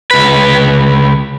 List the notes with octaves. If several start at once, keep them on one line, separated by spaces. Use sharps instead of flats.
C#2 B4